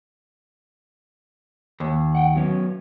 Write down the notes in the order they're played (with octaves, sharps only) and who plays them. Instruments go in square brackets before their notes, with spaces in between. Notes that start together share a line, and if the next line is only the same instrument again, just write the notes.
[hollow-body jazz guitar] D#2
[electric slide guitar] F#5 G5
F#3 B3 C#4